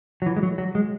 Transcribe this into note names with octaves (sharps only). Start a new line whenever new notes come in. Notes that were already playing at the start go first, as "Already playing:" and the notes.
F#3
E3
G#3
F#3
F#3
G#3